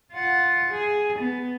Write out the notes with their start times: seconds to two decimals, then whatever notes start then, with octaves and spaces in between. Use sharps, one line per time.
0.12 F4 F#5
0.71 G#4
1.19 B3